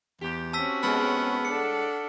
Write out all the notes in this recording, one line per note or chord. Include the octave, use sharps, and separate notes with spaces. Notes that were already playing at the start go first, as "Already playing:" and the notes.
E2 G4
C4 C#4 F#4 A5 E6 B6
A2 G#3 B3 F6
D4 A4 F#5 C#7